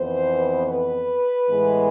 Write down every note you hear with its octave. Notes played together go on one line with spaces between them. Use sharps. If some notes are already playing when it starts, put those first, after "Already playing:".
Already playing: F2 E3 B3 C5
B4
A2 E3 G#3 B3